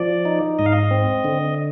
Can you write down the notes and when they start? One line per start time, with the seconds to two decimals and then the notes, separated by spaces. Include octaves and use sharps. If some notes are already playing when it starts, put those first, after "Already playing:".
Already playing: F3 D5
0.25 D#4
0.59 G#2 D#5
0.66 F5
0.72 D#5
0.91 C4
1.24 D3